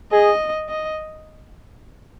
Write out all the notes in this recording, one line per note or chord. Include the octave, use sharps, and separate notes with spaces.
G#4 D#5
D#5